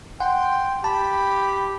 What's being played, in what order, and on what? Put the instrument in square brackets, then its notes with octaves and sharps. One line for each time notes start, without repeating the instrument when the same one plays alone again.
[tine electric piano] F#5 [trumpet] G5 [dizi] C6
[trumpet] G4 [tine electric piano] A5 [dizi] B5